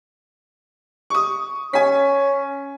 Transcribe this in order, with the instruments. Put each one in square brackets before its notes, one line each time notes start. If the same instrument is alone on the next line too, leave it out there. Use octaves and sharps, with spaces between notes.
[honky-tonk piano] C#6 D#6
[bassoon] C#4 [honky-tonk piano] G#5 B6